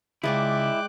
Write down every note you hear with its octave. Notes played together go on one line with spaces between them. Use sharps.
C#2 G#3 E4 D5 G5 C#6 D6 F#6